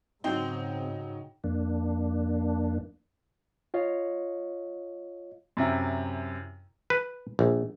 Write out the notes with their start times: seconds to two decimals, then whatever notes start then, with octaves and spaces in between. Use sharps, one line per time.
0.24 G#2 C#3 F#3 C4 D#4 G5
1.44 F2 A#3 D4
3.74 F4 C#5 D#5 F5
5.57 F#2 C3 E4
6.90 B4
7.39 A#1